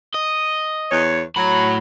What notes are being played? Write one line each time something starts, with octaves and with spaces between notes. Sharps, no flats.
D#5
E2 C#5
A2 F#3 B5